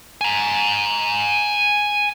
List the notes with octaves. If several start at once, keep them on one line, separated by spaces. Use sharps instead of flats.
G#5 A#5